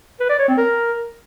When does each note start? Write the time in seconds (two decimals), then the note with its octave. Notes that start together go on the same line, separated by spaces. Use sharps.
0.20 B4
0.29 D5
0.39 C#5
0.48 C4
0.57 A#4